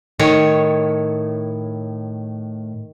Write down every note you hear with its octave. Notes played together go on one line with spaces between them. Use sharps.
A2 D#3 C#5